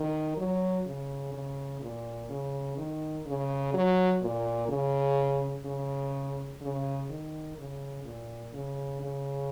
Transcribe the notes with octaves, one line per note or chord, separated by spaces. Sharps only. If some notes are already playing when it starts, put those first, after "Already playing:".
Already playing: D#3
F#3
C#3
C#3
A#2
C#3
D#3
C#3
F#3
A#2
C#3
C#3
C#3
D#3
C#3
A#2
C#3
C#3